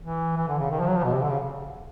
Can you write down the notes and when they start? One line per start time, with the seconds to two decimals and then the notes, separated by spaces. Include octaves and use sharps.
0.02 E3
0.37 E3
0.48 D3
0.59 C#3
0.71 D#3
0.80 F3
0.88 F#3
0.96 F3
1.04 B2
1.13 C3
1.22 D3
1.29 C#3